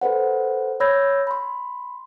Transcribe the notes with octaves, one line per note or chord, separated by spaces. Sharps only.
A4 B4 C5 F#5
C#5 B5 E6 G6 G#6 A#6
B5 C6